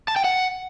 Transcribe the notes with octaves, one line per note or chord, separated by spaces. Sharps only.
A5
G5
F#5